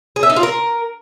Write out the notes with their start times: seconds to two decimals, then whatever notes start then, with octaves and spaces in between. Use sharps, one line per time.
0.16 G#4
0.23 E5
0.30 D#4
0.36 F4
0.43 A#4